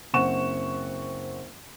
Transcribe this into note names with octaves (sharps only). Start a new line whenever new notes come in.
F#1 C4 F#5 C#6 E7